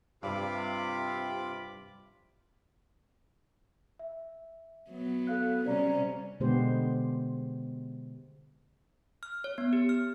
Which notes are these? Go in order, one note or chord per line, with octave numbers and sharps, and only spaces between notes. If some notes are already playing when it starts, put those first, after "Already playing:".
G2 C3 F4 B5 D6
E5
F#3 B3
A4 F5 F#6
C3 G3 C#4 C5 D5 A#5
B2 D3 G#3 B3 G4 C5
F6
C#5
B3
G4
F6